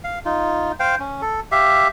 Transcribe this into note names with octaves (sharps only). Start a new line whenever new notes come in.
F5
D#4 F4
C5 F5 G5
C#4
A4
G4 E5 F5